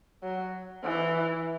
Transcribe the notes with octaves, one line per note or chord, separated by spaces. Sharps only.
F#3
E3